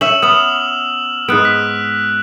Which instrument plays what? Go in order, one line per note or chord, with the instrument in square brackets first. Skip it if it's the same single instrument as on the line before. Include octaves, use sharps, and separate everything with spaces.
[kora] C#4 E5 [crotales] E6 E7 F#7
[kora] B3 [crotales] D#6 F6 F#7
[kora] G#2 B3 [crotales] D#6 F#6 D7
[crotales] B6